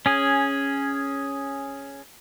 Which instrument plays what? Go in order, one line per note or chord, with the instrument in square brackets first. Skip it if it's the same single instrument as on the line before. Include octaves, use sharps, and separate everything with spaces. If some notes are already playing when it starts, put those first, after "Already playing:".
[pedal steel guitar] C#4 G#4